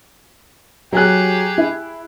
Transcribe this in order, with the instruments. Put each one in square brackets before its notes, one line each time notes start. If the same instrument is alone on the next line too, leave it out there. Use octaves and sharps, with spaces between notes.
[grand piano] F#3 F#6 [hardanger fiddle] G4 G#4
[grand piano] E4